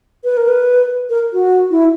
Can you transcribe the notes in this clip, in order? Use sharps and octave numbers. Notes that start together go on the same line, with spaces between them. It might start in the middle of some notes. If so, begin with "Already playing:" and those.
B4
A#4
B4
A#4
F#4
E4